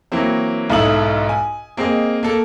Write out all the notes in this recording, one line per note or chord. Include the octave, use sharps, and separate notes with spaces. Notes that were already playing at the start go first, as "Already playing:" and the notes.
E3 F#3 A#3 C4
B1 G#2 E4 A4 D#6 F#7
G#5
A#3 C4 G#4 D#5
A#3 A4